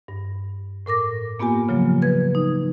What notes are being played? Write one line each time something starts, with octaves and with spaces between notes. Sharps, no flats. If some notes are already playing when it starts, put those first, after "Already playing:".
G2
A2 A#4 D6 A#6
A#3 B3 F4 G4 G#5
C#3 F3 F#3 A#3
B4 G#6
D#4